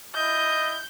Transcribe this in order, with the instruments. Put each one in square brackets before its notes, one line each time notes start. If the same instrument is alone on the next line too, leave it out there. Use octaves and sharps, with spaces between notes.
[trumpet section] E4 D#5 [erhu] G6